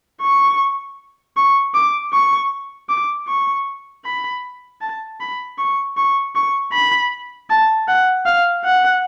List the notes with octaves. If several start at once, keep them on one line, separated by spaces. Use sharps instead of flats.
C#6
C#6
D6
C#6
D6
C#6
B5
A5
B5
C#6
C#6
C#6
B5
A5
F#5
F5
F#5